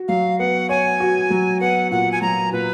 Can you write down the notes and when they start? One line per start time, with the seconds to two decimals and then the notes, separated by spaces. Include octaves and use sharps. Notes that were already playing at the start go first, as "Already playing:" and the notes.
Already playing: F#4
0.08 F#3 F5
0.39 B3 F#5
0.69 C#5 G#5
1.00 F#4
1.30 F#3
1.60 B3 F#5
1.91 A#2 F#5
2.12 G#5
2.22 F#3 A#5
2.52 A#2 B4